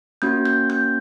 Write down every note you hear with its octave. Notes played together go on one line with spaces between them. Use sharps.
A#3 C#4 F#4 G6
G6
G6